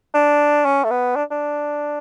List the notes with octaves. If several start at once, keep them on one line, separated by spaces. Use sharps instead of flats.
D4
C#4
A3
B3
D4
D4